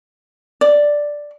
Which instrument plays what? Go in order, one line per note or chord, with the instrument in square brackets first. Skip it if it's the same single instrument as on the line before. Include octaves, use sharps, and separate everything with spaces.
[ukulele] D5